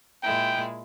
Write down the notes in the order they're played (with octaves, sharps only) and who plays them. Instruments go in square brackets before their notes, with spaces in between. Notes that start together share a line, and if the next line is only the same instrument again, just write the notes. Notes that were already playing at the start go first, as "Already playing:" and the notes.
[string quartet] A#2 G#3 E4 [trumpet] G5